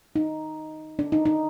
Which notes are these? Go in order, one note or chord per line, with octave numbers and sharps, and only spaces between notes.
D#4
D4
D#4
D#4